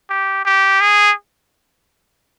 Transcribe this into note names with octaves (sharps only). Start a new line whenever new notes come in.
G4
G4
G#4